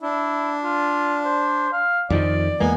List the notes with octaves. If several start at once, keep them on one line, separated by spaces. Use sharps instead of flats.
D4 E4
F4
C5
F5
F2 D#3 F3 D5
E2 G#3 A#3 B3 G#5